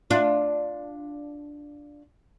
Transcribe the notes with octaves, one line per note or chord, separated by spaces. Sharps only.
D4 F4